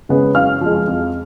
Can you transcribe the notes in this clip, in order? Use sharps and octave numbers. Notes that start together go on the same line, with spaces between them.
C#3 G#3 B3
F#2 F5 F6
F3 G#3
F2